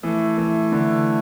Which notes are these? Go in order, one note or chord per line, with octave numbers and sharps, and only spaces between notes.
E3 A3
E3
D3